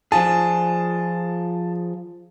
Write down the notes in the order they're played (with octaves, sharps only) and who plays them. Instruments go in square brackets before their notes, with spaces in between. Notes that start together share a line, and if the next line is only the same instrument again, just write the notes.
[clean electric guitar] F3 F4 G#4 [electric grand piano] A5